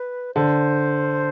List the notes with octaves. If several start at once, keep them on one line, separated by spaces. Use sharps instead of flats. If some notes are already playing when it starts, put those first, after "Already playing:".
Already playing: B4
D3 C5